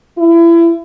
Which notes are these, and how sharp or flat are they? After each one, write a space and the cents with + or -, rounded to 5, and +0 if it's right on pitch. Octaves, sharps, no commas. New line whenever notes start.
E4 +30